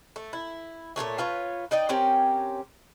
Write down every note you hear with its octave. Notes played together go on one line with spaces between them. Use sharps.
A3
E4
A#2 F#3 A3 C#5
F4 B4 C#5
D#4 D5 D#5 G5
C4 C#4 G4 A#4